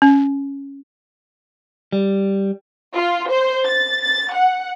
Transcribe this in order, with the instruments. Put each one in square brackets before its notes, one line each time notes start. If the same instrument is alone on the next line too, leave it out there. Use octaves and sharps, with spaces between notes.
[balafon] C#4
[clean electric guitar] G3
[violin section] F4
C5
A6
A6
F#5